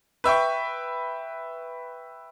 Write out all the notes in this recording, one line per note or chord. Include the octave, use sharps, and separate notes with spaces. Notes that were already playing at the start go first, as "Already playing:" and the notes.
B4 E5 G5 C#6